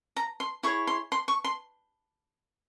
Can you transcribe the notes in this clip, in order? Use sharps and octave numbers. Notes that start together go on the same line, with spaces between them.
A#5
C6
E4 G#4 C#5 C#6
C6
C6
C#6
C6